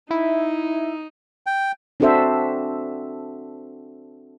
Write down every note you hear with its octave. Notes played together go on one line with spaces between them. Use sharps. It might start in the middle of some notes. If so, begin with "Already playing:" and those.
D#4 E4
G5
C4 D4 F#4 A4 C5 E5